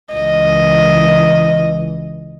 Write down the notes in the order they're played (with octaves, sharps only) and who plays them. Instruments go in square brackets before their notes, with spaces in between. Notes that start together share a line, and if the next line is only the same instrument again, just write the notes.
[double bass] C#2 E3 [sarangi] D#5